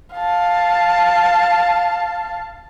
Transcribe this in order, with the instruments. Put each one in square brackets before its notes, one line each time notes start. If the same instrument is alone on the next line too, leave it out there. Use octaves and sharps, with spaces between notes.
[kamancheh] F5 A5